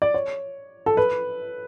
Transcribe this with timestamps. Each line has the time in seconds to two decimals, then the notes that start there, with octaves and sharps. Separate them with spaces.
0.02 D5
0.14 C#5
0.86 A4
0.97 B4